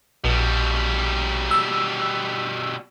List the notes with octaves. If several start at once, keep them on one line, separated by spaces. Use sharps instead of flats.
A#1 B2 G3
E6